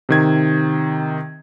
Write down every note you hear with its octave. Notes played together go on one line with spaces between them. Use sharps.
C3 D#3 G#6